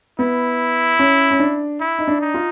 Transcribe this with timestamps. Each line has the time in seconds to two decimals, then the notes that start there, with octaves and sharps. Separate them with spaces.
0.19 B3 E4
0.99 C#4
1.31 C#4
1.40 D4
1.80 E4
1.98 D#4
2.08 D4
2.21 D#4
2.34 F4